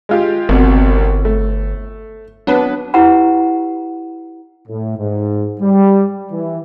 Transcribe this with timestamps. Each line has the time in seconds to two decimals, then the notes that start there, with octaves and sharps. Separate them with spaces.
0.09 G#3 F4 G4
0.49 G1 C2 B2
1.25 A3
2.47 F#3 B3 D4 B4
2.94 E4 G4 B4 F#5 A#5
4.68 A2
4.97 G#2
5.60 G3
6.31 E3